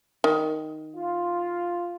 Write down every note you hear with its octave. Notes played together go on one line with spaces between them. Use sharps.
D#3
F4